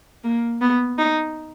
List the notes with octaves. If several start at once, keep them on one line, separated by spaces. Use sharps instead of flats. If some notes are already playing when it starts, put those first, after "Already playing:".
A#3
B3
D#4